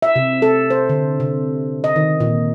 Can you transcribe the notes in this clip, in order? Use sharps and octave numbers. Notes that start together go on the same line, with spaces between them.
E5
C3
A4
C5
D3
C3
D#5
D#3
A#2